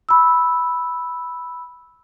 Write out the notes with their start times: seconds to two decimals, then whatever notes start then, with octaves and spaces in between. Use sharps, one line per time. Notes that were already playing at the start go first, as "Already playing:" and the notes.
0.09 B5 E6